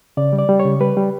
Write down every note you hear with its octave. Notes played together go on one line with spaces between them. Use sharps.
C#3 D5
G3
D5
G3
C#5
C#3
G3 B4
G3